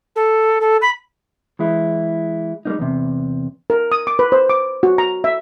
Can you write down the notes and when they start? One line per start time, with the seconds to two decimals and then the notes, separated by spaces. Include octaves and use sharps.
0.15 A4
0.61 A4
0.81 B5
1.59 E3 G#3 E4
2.65 G3 G#3 A#3 D#4
2.79 E2 C3
3.70 A#4
3.92 D#6
4.07 D6
4.19 B4
4.32 C5
4.50 D6
4.83 F#4
4.98 A#5
5.24 E5